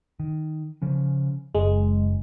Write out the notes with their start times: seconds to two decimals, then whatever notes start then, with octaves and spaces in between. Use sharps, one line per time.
0.20 D#3
0.82 C#3 F3 C#4
1.55 F#1 G#3